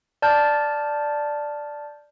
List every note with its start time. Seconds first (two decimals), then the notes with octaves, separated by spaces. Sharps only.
0.22 D5 A5 F6 G6